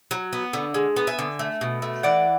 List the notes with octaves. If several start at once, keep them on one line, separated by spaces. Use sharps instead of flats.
F#3
B3
D3
G#3
B3
E5 G#5
D3
A3
B2
A3
E3 D5 F#5